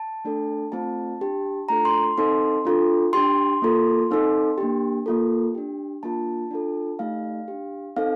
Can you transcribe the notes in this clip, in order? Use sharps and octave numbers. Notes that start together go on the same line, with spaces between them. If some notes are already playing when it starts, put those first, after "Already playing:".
Already playing: A5
A3 D4 A4
A3 C4 F4 A5
D4 G4
A3 D4 F4 A4 A#5
C6
C4 D#4 A4 C6
D4 F4 A4
D4 G4 C6
A#3 F4 A4
C4 D#4 A4
A#3 D4 G4
A#3 F4 A4
D4 G4
A#3 D4 F4 A5
D4 F4 A4
A3 D#4 G4 F5
D4 G4
C4 D#4 A4 F5